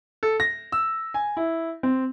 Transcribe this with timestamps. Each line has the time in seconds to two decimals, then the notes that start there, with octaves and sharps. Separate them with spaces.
0.23 A4
0.40 A#6
0.72 E6
1.14 G#5
1.37 E4
1.83 C4